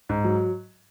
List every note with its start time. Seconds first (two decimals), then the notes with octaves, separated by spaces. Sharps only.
0.09 G#2
0.25 F#3